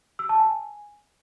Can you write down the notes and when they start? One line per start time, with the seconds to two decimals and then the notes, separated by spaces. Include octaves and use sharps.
0.19 E6
0.29 A5
0.40 G#5